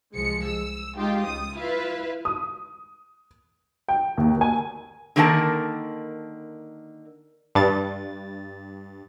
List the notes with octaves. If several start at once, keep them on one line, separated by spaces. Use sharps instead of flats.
C2 F3 G#3 C#7
E6
G#3 D#4 F4 G4
C#2 D#6
E4 F4 B4 E5 F5
D#6
G5
D#2
A#3 G#5
D3 D#3 A#3 A#4 F#5 A5
G2 A6